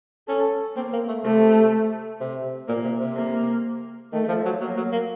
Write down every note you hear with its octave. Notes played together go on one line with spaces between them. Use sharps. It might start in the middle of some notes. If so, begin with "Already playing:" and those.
C#4 A4
A#3 C4
A#3
A3
C3 A3
C3
A#2 A#3
C3
C3
A#3
D#3 A3
F3
F#3
F#3 A#3
F#3
A#3